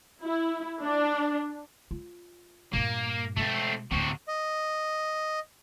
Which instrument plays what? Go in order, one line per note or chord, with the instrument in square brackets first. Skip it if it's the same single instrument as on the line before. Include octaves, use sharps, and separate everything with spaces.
[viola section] E4
D4
[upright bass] F4
[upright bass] G2 A#2 [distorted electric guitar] A#3
[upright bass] B2 G#3 [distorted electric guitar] A3 C4
[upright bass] D2 A2 [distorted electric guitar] C3 F#4
[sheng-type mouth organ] D#5